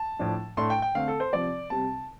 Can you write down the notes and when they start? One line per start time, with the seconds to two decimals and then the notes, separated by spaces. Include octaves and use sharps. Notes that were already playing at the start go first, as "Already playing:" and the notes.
Already playing: A5
0.19 A2 F3 D4
0.57 A2 A3 D4 C6
0.70 G5
0.82 G5
0.95 D3 A3 C4 F5
1.08 A4
1.20 C5
1.33 C3 F3 C4 D5
1.70 C3 G3 C4 A5